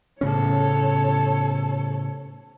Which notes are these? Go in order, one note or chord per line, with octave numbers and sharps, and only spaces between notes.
A2 C#3 C#4 A4 C#5